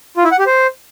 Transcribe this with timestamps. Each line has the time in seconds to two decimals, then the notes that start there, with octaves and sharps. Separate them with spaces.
0.17 F4
0.24 E4
0.32 F#5
0.39 G4
0.46 C5